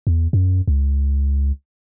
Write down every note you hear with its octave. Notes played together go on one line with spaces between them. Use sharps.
E2
F#2
C#2